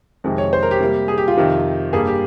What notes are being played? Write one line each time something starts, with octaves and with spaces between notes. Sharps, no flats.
F2 C3 D#3 G#3
C#5
C5
A#4
G4
C3 G3 A#3
G#4
G4
F4
F2 C3 D#3
G2 G3 A#3 G#4
G4